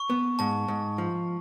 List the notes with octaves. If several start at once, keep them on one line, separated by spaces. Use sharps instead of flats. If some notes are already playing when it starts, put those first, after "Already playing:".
Already playing: C#6
B3
G#2 A5
G#2
F3